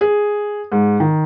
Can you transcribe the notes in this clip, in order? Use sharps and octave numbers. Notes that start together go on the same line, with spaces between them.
G#4
G#2
D#3